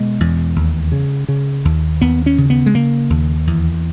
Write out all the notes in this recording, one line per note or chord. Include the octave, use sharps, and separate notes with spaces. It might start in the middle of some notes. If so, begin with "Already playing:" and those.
Already playing: B2 G#3
E2
D#2
C#3
C#3
D#2
D#2 B3
C#4
C#3
B3
G#3
C#3 A#3
D#2
E2